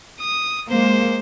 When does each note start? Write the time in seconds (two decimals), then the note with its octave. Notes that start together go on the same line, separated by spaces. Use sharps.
0.21 D#6
0.69 G#3 A#3 C5